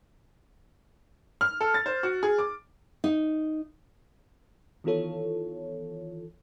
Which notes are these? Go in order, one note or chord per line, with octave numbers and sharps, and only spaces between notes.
F6
A4
A6
C5
F#4
G#4
D6
D#4
D#3 E3 B3 F4 A4 C#5